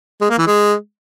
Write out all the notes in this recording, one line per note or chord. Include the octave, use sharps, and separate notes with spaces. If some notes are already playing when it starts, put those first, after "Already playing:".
G#3
A#3
E3
G#3